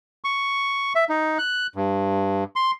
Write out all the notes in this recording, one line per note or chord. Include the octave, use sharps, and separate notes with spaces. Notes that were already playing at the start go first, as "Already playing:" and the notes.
C#6
E5
D#4
F#6
G2
C6